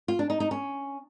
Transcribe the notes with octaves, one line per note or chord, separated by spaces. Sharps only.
F4
D4
D#4
D#4
C#4